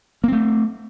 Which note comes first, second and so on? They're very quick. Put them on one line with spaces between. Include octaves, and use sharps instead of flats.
A#3 C4 A3